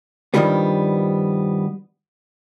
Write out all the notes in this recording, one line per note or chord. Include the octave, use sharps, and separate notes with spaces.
G2 A#2 D#3 F3 G3 B3